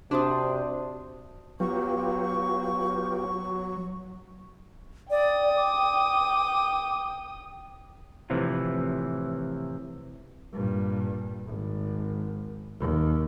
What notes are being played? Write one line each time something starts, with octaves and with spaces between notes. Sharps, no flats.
C3 D4 F#4 C5 C6 D#6
F#3 B3 F4 G4 C#6
D5 G5 D#6
D6
A2 C3 E3 F3
G2 A#2
G#1
D#2